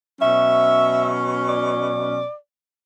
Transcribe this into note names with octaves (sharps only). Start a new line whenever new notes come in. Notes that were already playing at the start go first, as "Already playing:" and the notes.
B2 F#3 C#4 E5
D5